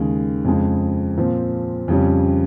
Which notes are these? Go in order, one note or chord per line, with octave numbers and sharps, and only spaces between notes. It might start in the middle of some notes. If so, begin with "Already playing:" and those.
Already playing: D#2 C#3 G#3
F2 C#3 G#3
A#2 F3 C4
F2 C#3 G3 C#4